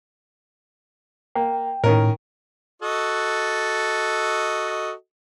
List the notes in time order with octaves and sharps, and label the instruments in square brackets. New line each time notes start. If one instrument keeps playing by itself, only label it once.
[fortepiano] A#3 [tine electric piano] G5
[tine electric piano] A2 [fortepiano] D#3 C#4 A#4
[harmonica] F#4 A4 D#5